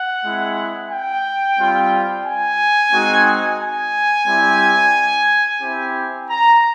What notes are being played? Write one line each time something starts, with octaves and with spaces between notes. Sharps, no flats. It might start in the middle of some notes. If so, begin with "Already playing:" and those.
Already playing: F#5
G#3 C4 E4
G5
G3 C4 F4
G#5
G#3 C4 D#4 F#4
G#5
G3 C4 E4 G4
C4 E4 G4
A#5